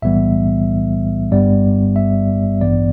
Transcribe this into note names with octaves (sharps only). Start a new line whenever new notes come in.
B1 A2 E3 G3 B3 E5
G1 G2 G3 B3 D5
E5
A1 G2 E3 B3 D5